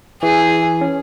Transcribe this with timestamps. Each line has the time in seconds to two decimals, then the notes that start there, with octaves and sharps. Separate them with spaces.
0.23 E3 G#4
0.81 C#4